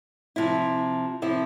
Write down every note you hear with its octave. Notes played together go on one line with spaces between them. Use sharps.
C3 F3 C4 E4
C3 F3 C4 E4